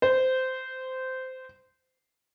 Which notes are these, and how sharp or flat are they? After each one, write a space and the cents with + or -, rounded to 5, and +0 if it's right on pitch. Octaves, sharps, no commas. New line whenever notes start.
C5 -15